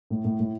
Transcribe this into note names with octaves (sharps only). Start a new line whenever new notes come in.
A2
A2
A2